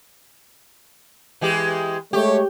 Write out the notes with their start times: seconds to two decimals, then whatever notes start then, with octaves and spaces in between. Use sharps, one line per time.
1.41 E3 G#3 G4
2.13 G#3 A3 G4 C#5